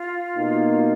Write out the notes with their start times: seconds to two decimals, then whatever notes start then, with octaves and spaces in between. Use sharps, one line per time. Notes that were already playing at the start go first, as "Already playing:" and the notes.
Already playing: F4
0.36 B2 A#3 D#4